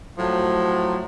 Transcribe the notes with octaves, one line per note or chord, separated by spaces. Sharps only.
A2 F3 F#3